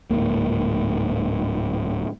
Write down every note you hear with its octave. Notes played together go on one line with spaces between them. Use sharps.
D1 G#1 G#2 A#3